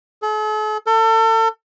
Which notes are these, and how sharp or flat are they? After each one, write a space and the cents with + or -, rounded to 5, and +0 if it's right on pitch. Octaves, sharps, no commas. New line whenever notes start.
A4 -45
A4 +35